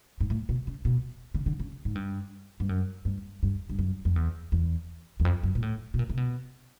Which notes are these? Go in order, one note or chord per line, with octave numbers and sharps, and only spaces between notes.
G#2
A2
B2
C#3
B2
C#3
D3
C#3
G#2
G2
G2
F#2
G2
G2
G2
F#2
F2
E2
E2
E2
F2
F#2
A#2
A2
B2
A#2
C3
B2